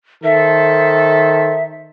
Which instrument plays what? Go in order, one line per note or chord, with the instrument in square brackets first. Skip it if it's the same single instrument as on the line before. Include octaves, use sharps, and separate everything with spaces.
[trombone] D#3 [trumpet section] A4 C5 [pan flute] E5